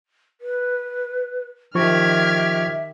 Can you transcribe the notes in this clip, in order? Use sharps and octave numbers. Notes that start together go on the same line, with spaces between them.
B4
D#3 F3 G4 E5 C#6 F6 G#6